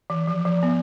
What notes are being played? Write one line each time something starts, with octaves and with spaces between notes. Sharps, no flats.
E3
F3
F3
B3